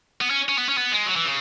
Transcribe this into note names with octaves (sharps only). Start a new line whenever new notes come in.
B3
C#4
C#4
B3
C#4
B3
G#3
F#3
E3
C#3